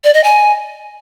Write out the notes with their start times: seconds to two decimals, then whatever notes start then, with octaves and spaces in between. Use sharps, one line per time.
0.04 D5
0.14 D#5
0.24 G#5